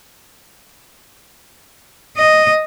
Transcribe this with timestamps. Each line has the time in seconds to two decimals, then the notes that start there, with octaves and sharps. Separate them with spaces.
2.17 D#5